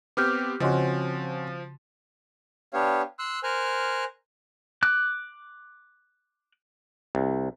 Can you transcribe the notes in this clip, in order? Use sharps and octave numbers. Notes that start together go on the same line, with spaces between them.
B3 C4 G4 D6 F6 G6
C#3 F3 C4 C#4 F#4 D#5 C6
B3 D4 G4 C#5 F5
C6 E6 F#6
A#4 C5 G#5 F6 F#6
D6 F#6
C2